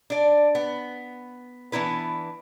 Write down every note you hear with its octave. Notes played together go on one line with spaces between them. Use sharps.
D4 D5
B3
E3 B3 D4 E4 B4